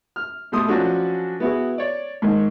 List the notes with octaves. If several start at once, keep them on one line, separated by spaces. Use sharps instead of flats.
F6
B2 G3 A3 E4 C6 D#6
F3 F#3 C#4 D4 F#4 A4
B3 E4 F#4 G#4
C#5 D5
G#2 D#3